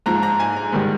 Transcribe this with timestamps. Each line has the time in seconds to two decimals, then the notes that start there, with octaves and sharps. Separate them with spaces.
0.06 G#2 F3 A#5
0.23 A#5
0.39 G#5
0.56 A#5
0.72 G#2 D#3 G3